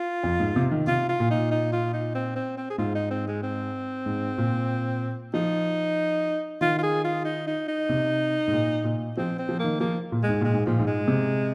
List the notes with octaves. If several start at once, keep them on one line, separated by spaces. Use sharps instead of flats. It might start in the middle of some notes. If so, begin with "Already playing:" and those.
Already playing: F4
F2
G#2
C3
D#3
C3 F4
F4
A#2
D#4
D#4
F4
D#4
C4
C4
C4
G#4
G#2 F4
D#4
C4
G#3
C4
G#2
A#2
F3 D#4
D#3 F4
F4
G#4
F4
D#4
D#4
D#4
C3
G#2
A#2
A#2
F3 C4
C4
F3
D#3 A#3
F3 A#3
A#2
G#3
G#2
A#2 G#3
G#2
A#2 F3
G#2
G#3
C3